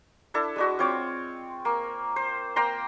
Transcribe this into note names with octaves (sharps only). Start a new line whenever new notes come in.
D4 E4 A4
G#3 D4 F#4
C4 F4 C#5 D6
A#3
C5
A#3 G5 A#5 C6